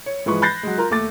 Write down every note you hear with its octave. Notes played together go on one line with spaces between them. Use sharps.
C#5
G#2 E3 F3 G#3 B4 C#6
B5 F#6 G6 A6 A#6 C7
F#3 G#3
F4 A#4 A#5
D#2 A3 D6 A6